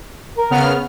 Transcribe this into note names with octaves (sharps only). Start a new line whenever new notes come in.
A#4
C#3 B3 F6